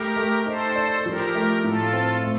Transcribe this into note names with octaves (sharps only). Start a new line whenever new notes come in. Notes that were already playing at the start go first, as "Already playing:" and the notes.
Already playing: A3 G4 A#4
A3
D#4 A4 C5
D5
F3 G4 A#4
A3
A2 F4 A4
C4
A3